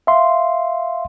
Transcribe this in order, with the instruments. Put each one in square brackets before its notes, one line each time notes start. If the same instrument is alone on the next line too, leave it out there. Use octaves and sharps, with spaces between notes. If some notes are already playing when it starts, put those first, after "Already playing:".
[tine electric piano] E5 F5 C6